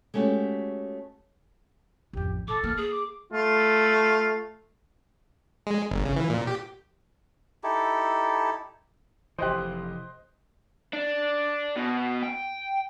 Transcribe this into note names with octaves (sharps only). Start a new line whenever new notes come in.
G#3 A3 C#4 F#4 G4
A1 F2 G4
A#2 A4 D6
A#3 F6
G#4 D#6
D6
A3 F4
G#3
G1
C#3
E3
A#2
G4
D#4 E4 G4 A4
F1 E3 G4 C5 D#5 C6 D#6 F#6
D4
B2
G5